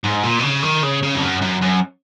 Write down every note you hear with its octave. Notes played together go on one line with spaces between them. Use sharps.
G#2
A#2
B2
C#3
D#3
C#3
C#3
F2
F#2
F#2
F#2